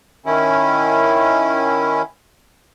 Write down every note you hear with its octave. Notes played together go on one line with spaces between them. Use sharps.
D#3 C#4 E4